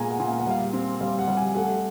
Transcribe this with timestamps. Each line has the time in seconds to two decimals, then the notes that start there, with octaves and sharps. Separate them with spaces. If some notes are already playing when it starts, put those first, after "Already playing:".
Already playing: A#2 G#3 B3 G#5 A#5
0.10 F#5
0.20 A#2
0.29 F5
0.39 F#5
0.47 G3 F5
0.73 C4
1.01 G3 F5
1.19 F#5
1.28 G3
1.37 G#5
1.55 A3 F#5